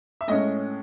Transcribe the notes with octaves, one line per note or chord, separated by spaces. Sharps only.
E5
A2 G#3 C#4 D#5